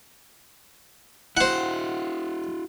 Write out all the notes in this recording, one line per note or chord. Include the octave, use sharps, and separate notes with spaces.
E4 F#4 C5 F#5